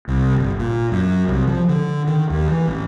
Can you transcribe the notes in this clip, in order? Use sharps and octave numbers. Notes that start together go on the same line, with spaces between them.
C2
G1
A#2
F#2
C2
F3
D3
D#3
D#2
E3
A1